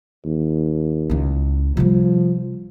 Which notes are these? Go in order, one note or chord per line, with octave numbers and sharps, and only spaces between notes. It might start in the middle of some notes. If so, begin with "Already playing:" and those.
D#2
C#2 E4
C3 F3 G3